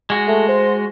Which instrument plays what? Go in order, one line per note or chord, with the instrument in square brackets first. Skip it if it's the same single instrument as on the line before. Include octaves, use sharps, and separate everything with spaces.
[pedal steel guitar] G#3 F#4
[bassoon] A3
C5